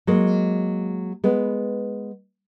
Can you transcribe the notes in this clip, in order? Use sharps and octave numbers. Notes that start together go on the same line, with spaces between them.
F#3 G#3 A#3
G#3 B3